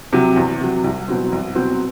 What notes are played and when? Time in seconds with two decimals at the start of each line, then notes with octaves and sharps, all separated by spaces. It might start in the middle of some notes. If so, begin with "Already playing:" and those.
0.13 C3 F#3
0.36 E2
0.61 C3 F#3
0.84 C2
1.08 B2 F#3 C4
1.32 C2
1.55 B2 F#3 C4